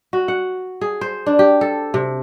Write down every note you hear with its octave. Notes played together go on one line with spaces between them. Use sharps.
F#4
F#5
G#4
C5
D4
G4
A4
C3